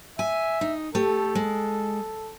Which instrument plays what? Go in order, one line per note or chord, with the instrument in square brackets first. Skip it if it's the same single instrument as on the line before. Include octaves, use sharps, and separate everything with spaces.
[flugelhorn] E5 [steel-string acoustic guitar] G#5
[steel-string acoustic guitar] D#4
[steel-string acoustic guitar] A3 G4 [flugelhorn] A4
[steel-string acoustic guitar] G#3